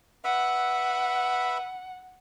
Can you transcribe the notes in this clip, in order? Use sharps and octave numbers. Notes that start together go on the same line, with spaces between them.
B4 E5 F#5 B5